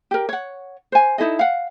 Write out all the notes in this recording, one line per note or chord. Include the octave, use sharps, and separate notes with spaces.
G4 A#4
C#5 F#5
C5 G#5
D#4 E4 A4 D#5
F5 F#5